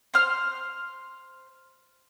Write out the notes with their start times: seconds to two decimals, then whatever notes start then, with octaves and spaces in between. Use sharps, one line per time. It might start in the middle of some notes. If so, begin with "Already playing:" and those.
0.14 C5 F6